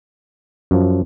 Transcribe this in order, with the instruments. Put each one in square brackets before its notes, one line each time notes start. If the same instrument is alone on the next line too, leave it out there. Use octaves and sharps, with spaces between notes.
[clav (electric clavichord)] F#2 F3